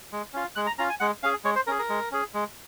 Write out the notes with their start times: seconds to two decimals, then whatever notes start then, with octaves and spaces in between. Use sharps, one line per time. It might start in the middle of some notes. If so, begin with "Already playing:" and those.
0.12 G#3
0.33 C#4 F4
0.56 G#3 F#6
0.67 A#5
0.78 C#4 F4 A#5
0.90 G#5
1.00 G#3 F#5
1.23 C#4 G#4 F5
1.44 G#3 C#5
1.56 C5
1.67 C#4 G#4 A#4
1.79 A#4
1.89 G#3
2.11 C#4 G#4
2.34 G#3